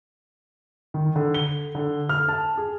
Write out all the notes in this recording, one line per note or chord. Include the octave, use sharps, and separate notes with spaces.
D#3
D3
G7
D3
F6
A5
G#4